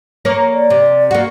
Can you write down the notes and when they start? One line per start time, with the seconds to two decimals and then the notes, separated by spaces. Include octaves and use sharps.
0.25 A#3 A#4 C#5
0.53 D5
0.70 C3
1.11 A#3 F#4